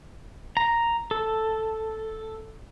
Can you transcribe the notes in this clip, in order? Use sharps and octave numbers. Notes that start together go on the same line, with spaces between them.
A#5
A4